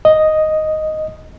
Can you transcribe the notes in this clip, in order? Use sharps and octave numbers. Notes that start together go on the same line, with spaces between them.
D#5